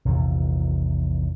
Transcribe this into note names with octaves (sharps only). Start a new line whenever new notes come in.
A#1 E2 C3 D#3